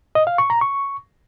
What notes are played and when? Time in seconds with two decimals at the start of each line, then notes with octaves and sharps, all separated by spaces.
0.15 D#5
0.27 F5
0.38 C#6
0.50 A#5
0.61 C#6